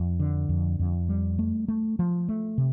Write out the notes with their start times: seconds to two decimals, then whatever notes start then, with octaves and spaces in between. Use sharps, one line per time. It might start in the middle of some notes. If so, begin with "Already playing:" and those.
Already playing: F2
0.20 D3
0.49 F2
0.79 F2
1.09 G3
1.39 A3
1.68 A3
1.99 F3
2.29 A3
2.58 C3